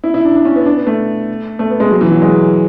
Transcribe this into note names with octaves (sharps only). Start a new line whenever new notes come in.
E4
E4
D4
D4
C#4
B3
D4
B3
A3
A3
B3
G#3
F#3
E3
F#3
G#3